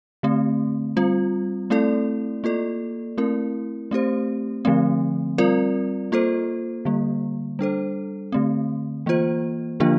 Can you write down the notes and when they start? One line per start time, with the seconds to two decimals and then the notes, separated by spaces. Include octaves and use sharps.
0.23 D3 A3 C4
0.97 G3 C4 F4
1.70 A3 C4 E4 A4 D5
2.44 A#3 F4 A4 D5
3.18 A3 C4 E4 A#4
3.91 A3 C4 G4 C5
4.65 D3 F3 A3 C4
5.38 G3 C4 F4 A#4 D5
6.12 A#3 F4 A4 C5
6.85 D3 G3 A#3
7.59 G3 D4 A4 C5
8.32 D3 A3 C4
9.06 E3 A#3 F4 C5
9.80 D3 F3 A#3 D4 F4